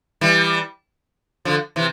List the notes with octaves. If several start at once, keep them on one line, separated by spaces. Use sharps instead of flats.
E3 G3
D3 F3
C3 E3